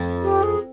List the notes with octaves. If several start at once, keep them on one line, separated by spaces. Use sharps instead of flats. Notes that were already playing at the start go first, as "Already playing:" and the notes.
Already playing: F2
G4
G#4